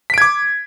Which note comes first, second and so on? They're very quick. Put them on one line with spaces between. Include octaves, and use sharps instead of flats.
B6 D7 G#6 D6